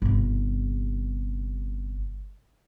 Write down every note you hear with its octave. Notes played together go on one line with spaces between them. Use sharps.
G1 C3